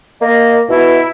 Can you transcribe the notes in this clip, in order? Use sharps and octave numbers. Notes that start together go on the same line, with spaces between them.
A#3 D#5
B2 E4